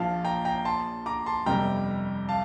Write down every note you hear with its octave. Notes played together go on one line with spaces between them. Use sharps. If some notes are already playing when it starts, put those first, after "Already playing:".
Already playing: A#1 A#2 F3 F5 A5
G5 A#5
G5 A#5
A5 C6
A#5 D6
A5 C6
G1 F2 C3 G3 G5 A#5
F5 A5